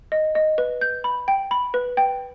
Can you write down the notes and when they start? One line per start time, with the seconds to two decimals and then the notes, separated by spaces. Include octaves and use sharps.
0.12 D#5
0.35 D#5
0.58 B4
0.81 G6
1.04 B5
1.28 G5
1.51 B5
1.74 B4
1.97 G5